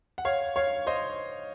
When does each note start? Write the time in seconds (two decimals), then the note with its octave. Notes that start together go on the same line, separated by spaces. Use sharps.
0.18 F#5
0.25 C#5 F5
0.56 C#5 F5
0.87 C5 D#5